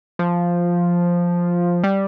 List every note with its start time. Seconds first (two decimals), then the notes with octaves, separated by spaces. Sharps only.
0.19 F3
1.84 G3